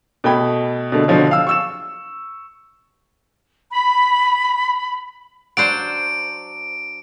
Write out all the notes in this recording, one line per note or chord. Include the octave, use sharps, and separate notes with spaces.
B2 A3 G5 B5 G#6
B2 D3 A3
B2 D3 F3 F#3
F5 E6
C#6 E6 E7
B5
F#3 D4 C5 D7